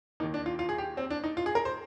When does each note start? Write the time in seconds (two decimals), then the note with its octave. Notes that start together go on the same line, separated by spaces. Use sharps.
0.20 D#2 D#3 A#3 D#4
0.34 D4
0.46 F4
0.59 F4
0.69 G#4
0.78 G4
0.97 C4
1.10 D4
1.24 D#4
1.37 F4
1.46 G#4
1.55 A#4
1.65 C5